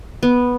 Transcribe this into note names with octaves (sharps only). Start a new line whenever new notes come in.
B3